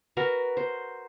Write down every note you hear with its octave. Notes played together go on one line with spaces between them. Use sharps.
F#4 A#4 B4
C5